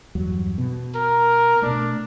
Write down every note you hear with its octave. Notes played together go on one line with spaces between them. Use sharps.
E2 G2 F#3
B2
A#4
B2 A3 D4